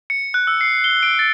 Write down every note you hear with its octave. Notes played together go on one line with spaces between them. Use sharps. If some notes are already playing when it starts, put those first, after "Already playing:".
C#7
F#6
E6
C7
G7
D7
A6